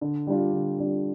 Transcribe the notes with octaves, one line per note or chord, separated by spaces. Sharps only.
D3
G3 D4 F4
D3
G3 D4 F4